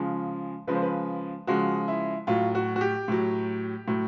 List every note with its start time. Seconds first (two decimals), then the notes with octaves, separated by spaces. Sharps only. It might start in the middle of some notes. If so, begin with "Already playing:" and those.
Already playing: C#3 F3 G#3
0.67 C#3 F3 G#3 B4
0.75 C5
0.82 B4
1.47 C#3 F3 G#3 F#4
1.88 E4
2.27 A2 F#3 F4
2.55 F#4
2.76 F#4
2.81 G4
3.08 A2 F#3
3.88 A2 F#3